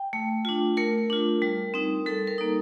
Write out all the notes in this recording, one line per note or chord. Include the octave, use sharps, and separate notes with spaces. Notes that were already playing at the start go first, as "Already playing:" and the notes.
Already playing: G5
A3
D4 F4
A3 A#4
D4 F4
G3
C4 D#4
G3 A4
A#4
A#3 D#4